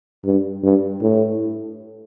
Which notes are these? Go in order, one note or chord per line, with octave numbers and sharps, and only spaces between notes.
G2
G2
A2